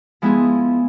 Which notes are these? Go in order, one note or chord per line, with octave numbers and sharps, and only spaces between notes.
F3 G#3 B3 E4 G#4